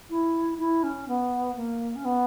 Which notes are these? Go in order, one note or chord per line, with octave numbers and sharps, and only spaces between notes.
E4
E4
C#4
B3
A#3
C#4
B3